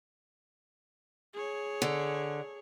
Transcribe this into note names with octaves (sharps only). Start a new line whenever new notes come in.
G#4 C#5
D3